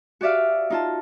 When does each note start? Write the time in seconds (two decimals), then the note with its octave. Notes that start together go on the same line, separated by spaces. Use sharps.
0.21 F#4 G4 D5 E5 F5
0.70 D#4 F4 A5